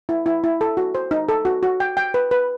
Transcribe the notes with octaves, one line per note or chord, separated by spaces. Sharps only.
E4
E4
E4
A4
F#4
C5
D#4
A4
F#4
F#4
G5
G5
B4
B4